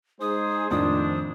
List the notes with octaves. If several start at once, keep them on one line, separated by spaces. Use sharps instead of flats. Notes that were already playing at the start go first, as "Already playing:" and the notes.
G#3 D#4 G#4 C5 D#6
F2 A2 D#3 F3 D4 D#6